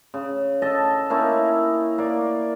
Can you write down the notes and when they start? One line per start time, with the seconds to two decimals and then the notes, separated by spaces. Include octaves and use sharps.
0.14 C#3
0.62 A4 D#5 A5
1.10 A#3 C#4 D#4 E4
1.98 A#3 D5